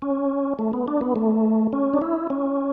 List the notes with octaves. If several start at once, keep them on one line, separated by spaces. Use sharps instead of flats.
C#4
A3
B3
D4
B3
A3
C#4
D4
E4
C#4